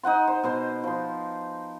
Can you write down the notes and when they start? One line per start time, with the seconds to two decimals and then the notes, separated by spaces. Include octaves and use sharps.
0.03 D#4 D#5 F#5 C6
0.28 C5
0.43 B2 C5 C6
0.84 F3 C6